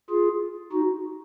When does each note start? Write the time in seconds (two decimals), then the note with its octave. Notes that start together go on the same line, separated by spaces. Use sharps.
0.10 F4 G#4
0.72 D#4 F#4